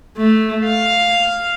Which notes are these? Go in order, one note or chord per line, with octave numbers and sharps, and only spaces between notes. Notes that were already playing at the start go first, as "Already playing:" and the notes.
A3
F5